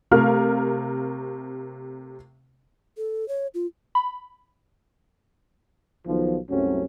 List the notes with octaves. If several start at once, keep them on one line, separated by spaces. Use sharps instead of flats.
C3 A3 A#4 F5 F6
A4
C#5
F4
B5
B1 B2 D#3 F3
C2 F#2 C3 F#3 A3 C#4